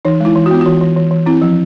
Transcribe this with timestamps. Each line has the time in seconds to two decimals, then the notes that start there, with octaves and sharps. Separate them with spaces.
0.05 E3 D#4
0.20 G#3 E4
0.36 E3
0.46 F#4
0.51 B3 F4
0.61 E3 F#4
0.81 E3
0.96 E3
1.11 E3
1.26 C4 E4
1.42 F3